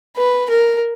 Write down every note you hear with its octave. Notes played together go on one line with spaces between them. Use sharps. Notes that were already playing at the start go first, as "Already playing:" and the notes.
B4
A#4